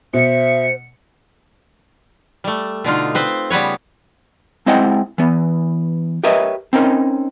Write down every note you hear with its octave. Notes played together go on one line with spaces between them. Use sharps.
B2 C5 E5 C#7
G3 A3
B2 D3 D#4 F4
C4 B4 C5
C#3 G3 B3 B4 C#5
G#3 C4 E4 D#5 F#5 G5
E3 B3
G4 A#4 B4 C#5 D#5 E5
C4 C#4 D#4 A#4